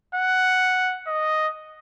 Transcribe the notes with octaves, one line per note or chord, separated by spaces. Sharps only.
F#5
D#5